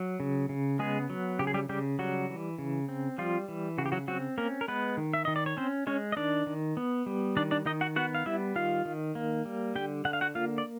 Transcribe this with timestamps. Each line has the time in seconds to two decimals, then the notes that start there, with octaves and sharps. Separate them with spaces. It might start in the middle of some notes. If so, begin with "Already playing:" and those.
Already playing: F#3
0.20 C#3
0.49 C#3
0.79 G#3 B3 G#4
1.10 F#3
1.39 C#3 G4
1.47 G#4
1.54 G3 G4
1.69 C#3 G3 G4
1.99 F#3 G3 F#4
2.29 E3
2.58 C#3
2.89 C4
3.18 F3 G3 F4
3.48 E3
3.78 C#3 F#4
3.86 G4
3.92 F#3 F#4
4.08 F#3 C4 F#4
4.38 A#3 C#4 A#4
4.61 A#4
4.68 G#3 B3 B4
4.97 D#3
5.13 E5
5.25 D#3 D#5
5.36 D5
5.46 C#5
5.57 C4 C#4 C5
5.87 G#3 C#4 C#5
6.12 D#5
6.17 D#3 D4 D5
6.47 D#3
6.77 B3
7.06 G3
7.37 D#3 D4 D5
7.51 D4 D5
7.66 D#3 D#4 D#5
7.81 F#4 F#5
7.96 B3 F#4 F#5
8.15 F5
8.26 G3 E4 E5
8.56 D#3 F4 F5
8.85 D#3
9.15 A#3
9.45 G3
9.75 D3 G4 G5
10.05 D3 F#5
10.13 F5
10.21 F#4 F#5
10.35 A#3 F4 F5
10.58 D5